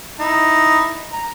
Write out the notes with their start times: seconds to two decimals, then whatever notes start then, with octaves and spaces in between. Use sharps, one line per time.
0.19 D#4 E4
1.13 A#5